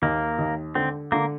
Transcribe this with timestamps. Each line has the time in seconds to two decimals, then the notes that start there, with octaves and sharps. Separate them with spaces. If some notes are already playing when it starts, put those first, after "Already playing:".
0.02 D#2 A#3
0.39 D#2
0.75 D3 C4
1.12 D3 A#3